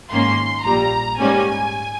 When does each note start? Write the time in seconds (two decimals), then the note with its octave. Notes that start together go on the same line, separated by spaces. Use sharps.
0.11 G#2 D#3 A#3 C#4 C6
0.65 A#1 A#2 G3 A#5
1.18 G#2 G3 A#3 C#4 G#5